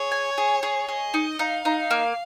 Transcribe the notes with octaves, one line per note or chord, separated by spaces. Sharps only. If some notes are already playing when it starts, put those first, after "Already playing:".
Already playing: G#4 C#5
G#5
G#4
G#4
G#4 D#5
D#4
D#4 F5
D#4
A#3